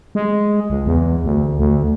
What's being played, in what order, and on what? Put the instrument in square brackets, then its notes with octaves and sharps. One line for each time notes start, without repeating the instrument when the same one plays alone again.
[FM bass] G#3
C#2
E2
D2
D2